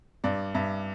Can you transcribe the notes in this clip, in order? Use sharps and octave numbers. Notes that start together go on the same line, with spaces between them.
G2 D5
G2 E5